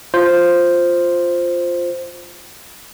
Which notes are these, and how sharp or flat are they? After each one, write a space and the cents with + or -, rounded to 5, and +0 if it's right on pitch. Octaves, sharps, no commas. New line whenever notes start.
F4 +0 C5 +0